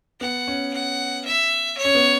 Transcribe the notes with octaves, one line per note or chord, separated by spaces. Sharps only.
B3 F#5
C#4
F#5
E5
C#5
C#4
B3